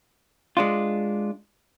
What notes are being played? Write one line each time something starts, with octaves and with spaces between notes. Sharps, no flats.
G#3 D4 F4